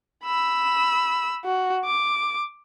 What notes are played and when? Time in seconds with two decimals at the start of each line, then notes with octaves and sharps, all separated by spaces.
0.24 B5 E6
1.45 F#4
1.85 D6